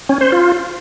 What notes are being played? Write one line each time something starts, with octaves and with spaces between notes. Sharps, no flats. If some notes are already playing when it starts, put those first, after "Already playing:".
C#4
C5
F4